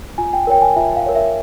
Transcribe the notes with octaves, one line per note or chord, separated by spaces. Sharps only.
F4 G#5
G5
A#4 C#5 G5
G#5
F4 E5
F5
A#4 C#5
E5